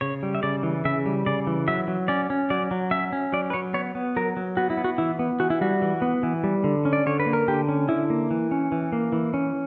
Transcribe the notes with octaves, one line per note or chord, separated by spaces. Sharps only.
C#3 C#5
G3
E5
C#3 D5
E3
C#3 E5
G3
C#3 D5
E3
F#3 E5
F#3
C#4 D5
C#4
F#3 D5
F#3
C#4 E5
C#4
F#3 D5
B4
F#3 C#5
B3 C#5
B3
F#3 A#4
F#3
B3 F#4
E4
B3
F#4
E3 E4
B3
E3 F#4
E4
G3 F#4
E3
B3
E3
G3
D3
C#4
D5
D3 C#5
B4
A#3
A#4
D3 G4
C#4
D3 E4
A#3
E3
C#4
E3
A#3
E3
C#4